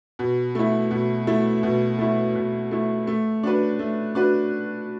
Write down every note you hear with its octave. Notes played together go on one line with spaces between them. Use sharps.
B2
A3 E4
B2
A3 E4
B2
A3 E4
B2
A3 E4
A3
D4 F#4 B4
A3
D4 F#4 B4